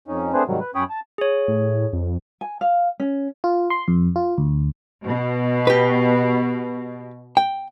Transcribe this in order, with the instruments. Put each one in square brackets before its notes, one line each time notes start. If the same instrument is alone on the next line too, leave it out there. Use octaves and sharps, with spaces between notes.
[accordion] F2 C#4 D#4
A3 C4 D4 G#4 B4 C5
G#2 C3 D#3 F#3 G3
B4
F#2 C#4 C#5 G5 B5 D#6
A5
[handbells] G#4 C#5
[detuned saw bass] A2
F2
[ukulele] G#5
F5
C#4
[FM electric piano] F4
C6
F2
F4
D2
[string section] B2
[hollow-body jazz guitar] G4 B4
G5